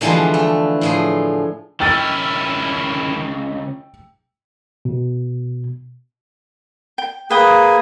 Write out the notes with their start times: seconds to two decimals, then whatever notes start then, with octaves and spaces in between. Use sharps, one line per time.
0.01 D3 E3 F3 G3 G#3 B3
0.34 A3
0.81 A2 F3 G#4
1.80 C#2 D#3 C#4 E4 G5 E6 A6
4.85 B2
6.98 G5
7.30 A#3 G#4 B4 G5 D#6